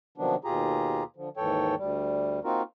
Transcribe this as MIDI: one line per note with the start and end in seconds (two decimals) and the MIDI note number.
0.18 0.36 48
0.18 0.36 51
0.18 0.36 53
0.18 0.36 54
0.18 0.36 59
0.18 0.36 62
0.44 1.04 39
0.44 1.04 47
0.44 1.04 65
0.44 1.04 67
0.44 1.04 68
0.44 1.04 82
1.16 1.29 50
1.16 1.29 53
1.37 1.75 39
1.37 1.75 44
1.37 1.75 52
1.37 1.75 69
1.37 1.75 73
1.37 1.75 79
1.78 2.40 38
1.78 2.40 55
2.44 2.62 58
2.44 2.62 60
2.44 2.62 63
2.44 2.62 65
2.44 2.62 66
2.44 2.62 70